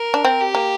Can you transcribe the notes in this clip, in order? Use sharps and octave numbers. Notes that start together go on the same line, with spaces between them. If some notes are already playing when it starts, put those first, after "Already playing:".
Already playing: A#4
D4
C4
G4
A#3